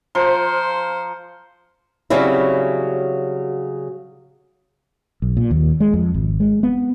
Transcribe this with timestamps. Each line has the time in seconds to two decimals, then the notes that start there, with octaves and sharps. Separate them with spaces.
0.15 F3 C5 A#5 C7 C#7
2.10 C#3 F#3 G3 C4 C#4 E4
5.22 B1
5.37 A#2
5.51 D#2
5.80 G#3
5.94 F2
6.14 G#1
6.40 G#3
6.63 B3